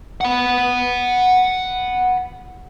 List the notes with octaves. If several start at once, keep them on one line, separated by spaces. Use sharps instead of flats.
F#5 B5